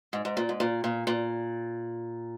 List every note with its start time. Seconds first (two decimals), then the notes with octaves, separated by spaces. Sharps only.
0.13 G#2
0.25 G#2
0.37 A#2
0.49 G#2
0.60 A#2
0.84 A#2
1.07 A#2